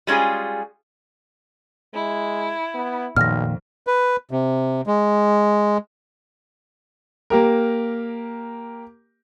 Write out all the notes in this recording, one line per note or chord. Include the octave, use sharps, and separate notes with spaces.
G3 G#3 C#4 F4 G#4
G#3 E4
B3
B1 F2 A#2 D#3 F6 A#6
B4
C3
G#3
A#3 G4 A#4